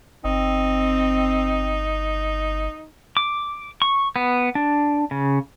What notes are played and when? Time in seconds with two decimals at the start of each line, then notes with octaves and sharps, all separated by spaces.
0.24 G1 C4 D#4
3.17 D6
3.82 C#6
4.16 B3
4.55 D4
5.11 C#3